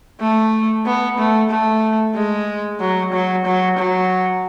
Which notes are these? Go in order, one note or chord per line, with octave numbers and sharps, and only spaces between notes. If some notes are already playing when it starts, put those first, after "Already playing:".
A3
B3
A3
A3
G#3
F#3
F#3
F#3
F#3